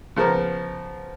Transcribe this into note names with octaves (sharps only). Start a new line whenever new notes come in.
C#3 F3 B3 A#4